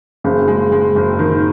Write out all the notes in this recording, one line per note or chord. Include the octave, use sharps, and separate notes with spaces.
F#1 C#3
G#3
G#3
F#1
D#3